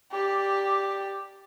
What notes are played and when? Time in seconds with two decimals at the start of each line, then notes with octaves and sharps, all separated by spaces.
0.11 G4 D5